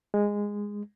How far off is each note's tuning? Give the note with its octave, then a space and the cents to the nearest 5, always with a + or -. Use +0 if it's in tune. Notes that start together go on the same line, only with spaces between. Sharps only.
G#3 -15